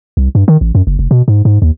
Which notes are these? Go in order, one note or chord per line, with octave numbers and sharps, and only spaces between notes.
C2
G2
D#3
A1
F#2
F#1
F1
B2
G#2
G#2
D#2